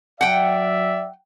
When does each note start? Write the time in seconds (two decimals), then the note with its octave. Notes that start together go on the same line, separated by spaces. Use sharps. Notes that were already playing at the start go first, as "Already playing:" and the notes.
0.21 F#3 D5 E5 F#5 G5